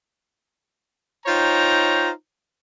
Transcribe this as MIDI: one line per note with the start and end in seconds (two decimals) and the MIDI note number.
1.26 2.09 63
1.26 2.09 65
1.26 2.09 72
1.26 2.09 73
1.26 2.09 79
1.26 2.09 82